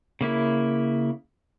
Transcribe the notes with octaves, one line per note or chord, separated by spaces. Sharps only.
C#3 A#3 E4